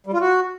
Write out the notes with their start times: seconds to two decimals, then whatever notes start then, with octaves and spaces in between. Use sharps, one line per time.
0.06 G3
0.14 F4
0.21 F#4